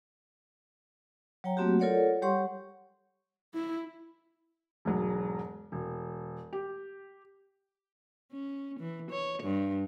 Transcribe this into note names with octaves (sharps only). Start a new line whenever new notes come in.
F#3 C#5 G5 A#5
F#3 A3 A#3 C4 F#4 G4
F4 A4 A#4 C#5 D5 F#5
G3 G4 C#5 F#5 C6 C#6
E4
E1 G#2 F#3 G#3
E1
G4
C#4
E3
C#5
G2